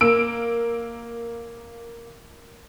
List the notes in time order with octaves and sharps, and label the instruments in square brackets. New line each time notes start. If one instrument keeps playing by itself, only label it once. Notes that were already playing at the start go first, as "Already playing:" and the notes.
[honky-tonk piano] A#3 E6 D7